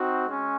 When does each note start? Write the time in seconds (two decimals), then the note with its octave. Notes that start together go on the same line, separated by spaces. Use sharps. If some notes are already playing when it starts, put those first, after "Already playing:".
Already playing: C4 D#4 F#4
0.28 G#3 C#4